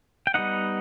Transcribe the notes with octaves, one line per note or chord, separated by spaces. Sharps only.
G5
G3 B3 D#4 D#5 F#5